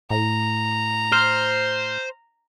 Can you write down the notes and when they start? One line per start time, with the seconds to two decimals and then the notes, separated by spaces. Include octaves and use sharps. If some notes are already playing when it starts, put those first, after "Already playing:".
0.10 A2 A#5
1.12 C5 F6